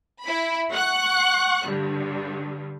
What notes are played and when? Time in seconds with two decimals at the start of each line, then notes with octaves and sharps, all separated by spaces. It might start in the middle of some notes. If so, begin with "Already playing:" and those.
0.22 E4 B5
0.72 F#5 C#6 F#6
1.67 G2 D3